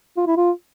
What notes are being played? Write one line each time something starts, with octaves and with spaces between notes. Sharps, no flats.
F4
E4
F4